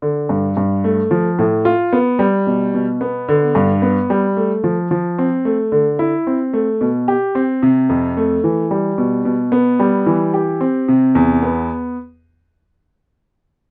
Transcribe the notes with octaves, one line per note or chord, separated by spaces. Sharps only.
D3
G2
G2
A3
F3
A2
F4
B3
G3
B2
B2
B3
D3
G2
B3
G3
A3
F3
F3
C4
A3
D3
E4
C4
A3
B2
G4
C4
C3
F2
A3
E3
G3
B2
B2
B3
G3
E3
G4
C4
C3
E2
B3